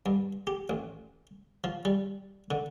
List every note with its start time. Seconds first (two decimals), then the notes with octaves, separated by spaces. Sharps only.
0.06 G2
0.47 G4
0.70 A1
1.64 F3
1.85 G3
2.51 D3